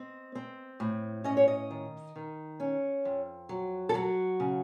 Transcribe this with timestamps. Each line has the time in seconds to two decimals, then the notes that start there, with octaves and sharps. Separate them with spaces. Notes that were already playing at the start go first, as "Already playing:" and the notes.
Already playing: C4 D#5
0.35 C4
0.80 A2
1.24 C#4 D#5
1.37 C#5
1.48 D#5
1.70 D#3
2.16 D#3
2.60 C#4
3.05 F2
3.49 F#3
3.89 A4
3.94 F#3 F#4
4.40 C#3